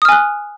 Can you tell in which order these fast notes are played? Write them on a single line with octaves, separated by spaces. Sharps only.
D#6 F6 G#5 F#6